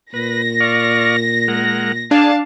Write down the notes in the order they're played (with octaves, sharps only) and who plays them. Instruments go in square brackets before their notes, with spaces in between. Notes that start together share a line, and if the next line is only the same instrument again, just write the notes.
[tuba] A#2 [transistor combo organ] B4 [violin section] A#6
[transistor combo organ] D5 F5 C#6
G#3 A#4 F#5
[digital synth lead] D4 [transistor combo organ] G#4 [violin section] F5 A5